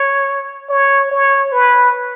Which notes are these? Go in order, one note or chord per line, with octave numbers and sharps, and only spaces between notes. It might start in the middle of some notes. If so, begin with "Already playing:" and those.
Already playing: C#5
C#5
C#5
B4